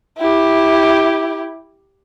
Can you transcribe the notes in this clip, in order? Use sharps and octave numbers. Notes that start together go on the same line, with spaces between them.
E4 G4